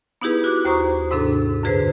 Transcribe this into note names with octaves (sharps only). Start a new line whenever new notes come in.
B3 D#4 E4 G4 G#4 B4
F#4 D6 F#6
D#2 C5 A#5 C#6 D#6
G#2 C3 D4 A4
F#2 D3 G#4 B4 C5